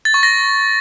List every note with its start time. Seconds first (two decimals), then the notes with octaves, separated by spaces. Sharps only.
0.05 A6
0.14 C#6
0.23 A#6